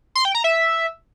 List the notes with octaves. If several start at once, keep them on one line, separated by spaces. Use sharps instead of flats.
C6
G5
A#5
E5